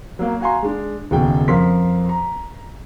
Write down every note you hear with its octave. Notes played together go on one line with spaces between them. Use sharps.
F#3 A#3
F#4 F5 G#5 A#5 C6
G#3 D4
F#1 D#2 B2 G#4 A4 G5
F2 F3 A#4 C6 B6
A#5